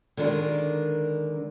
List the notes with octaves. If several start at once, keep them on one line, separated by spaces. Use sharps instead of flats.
D3 D#3 G#3 D4 A#4 B4